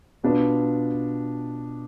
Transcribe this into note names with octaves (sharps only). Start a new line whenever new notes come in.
B2 B3 D4 F4 B4